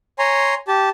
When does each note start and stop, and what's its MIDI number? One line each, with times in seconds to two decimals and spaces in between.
0.19 0.54 73
0.19 0.54 80
0.19 0.54 82
0.19 0.54 84
0.68 0.89 67
0.68 0.89 81